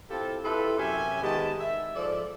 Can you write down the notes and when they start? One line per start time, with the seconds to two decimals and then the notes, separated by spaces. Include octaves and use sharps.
0.10 C4 E4 F4 G4 A4
0.43 E4 F4 G4 A4 B4
0.79 F#2 C3 C#4 G4 E5 G#5
1.22 D#3 G#3 B3 G4 B4 A5
1.59 E5
1.95 G#2 F3 A4 D5